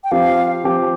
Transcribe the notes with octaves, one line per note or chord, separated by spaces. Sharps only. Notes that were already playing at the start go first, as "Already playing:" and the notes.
G5
F3 C4 G4 F5
F3 C4 G4